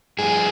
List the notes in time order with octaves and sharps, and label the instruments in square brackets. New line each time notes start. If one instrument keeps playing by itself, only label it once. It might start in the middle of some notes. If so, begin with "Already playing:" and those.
[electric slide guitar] G2 F3 G#4